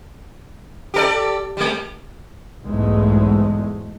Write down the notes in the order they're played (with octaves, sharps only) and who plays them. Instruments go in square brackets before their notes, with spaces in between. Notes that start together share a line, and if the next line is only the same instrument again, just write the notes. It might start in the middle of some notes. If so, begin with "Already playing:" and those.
[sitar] G4 A4 D5
G3 G#3
[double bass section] B1 E2 G#2 G#3 A3